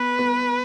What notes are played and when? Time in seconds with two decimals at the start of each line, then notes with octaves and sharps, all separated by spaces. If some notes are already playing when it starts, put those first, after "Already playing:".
Already playing: B3 B4
0.19 B3